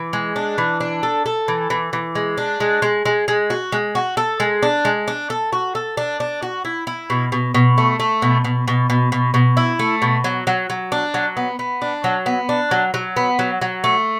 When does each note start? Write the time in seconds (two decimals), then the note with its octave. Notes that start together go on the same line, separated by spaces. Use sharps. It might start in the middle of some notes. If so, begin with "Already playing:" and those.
Already playing: E3
0.13 G#3
0.36 D4
0.58 E3
0.81 D4
1.03 A4
1.26 A4
1.48 E3
1.70 E3
1.93 E3
2.15 G#3
2.38 D4
2.60 G#3
2.82 G#3
3.06 G#3
3.28 G#3
3.50 F#4
3.72 G#3
3.95 F#4
4.17 A4
4.40 G#3
4.63 D4
4.85 G#3
5.08 D4
5.30 A4
5.52 F#4
5.75 A4
5.97 D4
6.20 D4
6.42 F#4
6.65 E4
6.87 E4
7.10 B2
7.32 B2
7.55 B2
7.78 A3
8.00 A3
8.22 B2
8.44 B2
8.68 B2
8.90 B2
9.12 B2
9.34 B2
9.57 E4
9.79 A3
10.02 B2
10.24 F#3
10.47 F#3
10.70 F#3
10.92 D4
11.14 F#3
11.37 B3
11.59 B3
11.82 D4
12.04 F#3
12.26 B3
12.49 D4
12.71 F#3
12.94 F#3
13.16 B3
13.39 F#3
13.61 F#3
13.84 A3